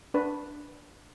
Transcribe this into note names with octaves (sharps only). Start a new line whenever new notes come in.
D4 B4